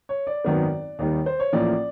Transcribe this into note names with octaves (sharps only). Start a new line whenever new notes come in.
C#5
D5
G#1 F#2 D#3 F#3 B3
D#2 D#3 G3
C5
C#5
A1 A2 F3 A#3 D5